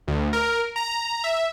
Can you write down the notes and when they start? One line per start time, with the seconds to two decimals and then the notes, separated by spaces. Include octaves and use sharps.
0.08 D2
0.33 A#4
0.76 A#5
1.24 E5